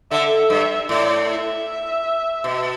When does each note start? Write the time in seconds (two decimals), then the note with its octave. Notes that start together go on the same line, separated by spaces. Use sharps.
0.11 D3 E5
0.50 G2 E5
0.89 A2 D5
1.28 E5
2.44 B2